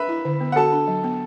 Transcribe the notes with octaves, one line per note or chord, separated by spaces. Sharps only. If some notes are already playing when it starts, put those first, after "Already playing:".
Already playing: B4 E5 B5
E4
D3
B3
F#5
F#4 A4 A5
D4
F#3
B3